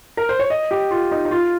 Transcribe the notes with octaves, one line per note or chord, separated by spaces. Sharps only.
A#4
C5
C#5
D#5
G4
F4
D#4
D#4
F4